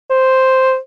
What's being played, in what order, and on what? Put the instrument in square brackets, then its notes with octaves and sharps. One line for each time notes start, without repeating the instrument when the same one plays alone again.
[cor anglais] C5